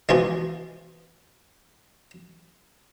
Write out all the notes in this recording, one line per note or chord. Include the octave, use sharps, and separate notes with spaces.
B2 E3 F3 G#3